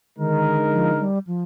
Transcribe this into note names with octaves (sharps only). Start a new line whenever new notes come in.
D3 D#3 G#3 D#4 A#4
F3
G3
F3